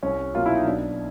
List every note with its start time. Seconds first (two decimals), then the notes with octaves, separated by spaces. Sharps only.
0.03 C2 C#4
0.33 B2 F#3 A#3 F4
0.46 E4
0.55 D#4
0.65 B1 D4